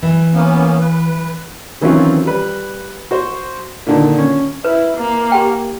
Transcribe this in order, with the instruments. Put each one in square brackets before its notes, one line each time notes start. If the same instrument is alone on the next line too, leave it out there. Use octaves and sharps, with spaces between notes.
[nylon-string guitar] E3
[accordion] A#3 B3 C#4
B4
[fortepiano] D#3 E3 F#3 C4 C#4 F4
G3 B4
F#4 C5
A#2 D3 D#3
C#4
[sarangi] E4 [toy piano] B4
[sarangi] A#3
[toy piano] G4 F#5 G5